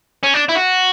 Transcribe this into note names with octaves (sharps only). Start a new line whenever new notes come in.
C#4
D4
E4
F#4